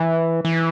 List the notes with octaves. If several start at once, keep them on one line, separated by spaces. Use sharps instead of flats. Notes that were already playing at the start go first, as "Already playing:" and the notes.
Already playing: E3
E3